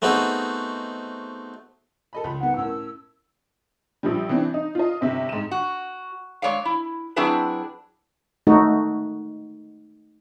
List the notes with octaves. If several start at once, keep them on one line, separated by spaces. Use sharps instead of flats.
A3 B3 C4 D#4 F#4 G#4
A4 D#5 B5
C#2 B5
G#2 B3 F#5
A2 C#4 A#4 E6
A#1 F3 G3
E3 C4 D4
D#4
F4 D#5
G1 C3 E5
G#2 E7
F#4
G#3 C#5 D5 F5
E4
F#3 C4 D4 E4 G#4 B4
A3 D#4 F#4